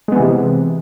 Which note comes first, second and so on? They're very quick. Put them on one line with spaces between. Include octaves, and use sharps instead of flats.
G#3 B3 E3 C3